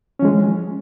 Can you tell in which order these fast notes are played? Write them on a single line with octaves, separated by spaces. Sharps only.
C#4 F3 G#3 E3